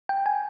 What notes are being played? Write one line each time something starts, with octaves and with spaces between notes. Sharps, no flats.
G5
G#5